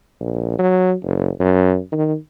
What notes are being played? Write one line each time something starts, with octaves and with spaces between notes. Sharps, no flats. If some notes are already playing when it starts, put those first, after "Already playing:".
A#1
F#3
F#1
F#2
D#3